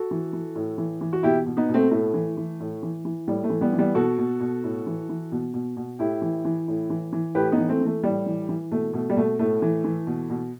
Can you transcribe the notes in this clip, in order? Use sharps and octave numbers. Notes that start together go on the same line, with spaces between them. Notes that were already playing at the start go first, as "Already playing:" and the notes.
Already playing: F#4 A4
E3
E3
A2
E3
E3
F#4
B2 E4 G4
B2
B3 D#4
B2
A3 C4
A2 A3
E3
E3
A2
E3
E3
A2 G3
A3
E3
G3 B3
E3
G3 B3
B2 F#4 A4
B2
B2
A2
E3
E3
B2
B2
B2
A2 E4 G4
E3
E3
A2
E3
E3
A2 G4 B4
B3 D#4
E3
A3 C4
E3
A3
A2 G3
E3
E3
B2 A3
B2 A3
G3
B2 A3
A2 A3
E3
E3
B2
B2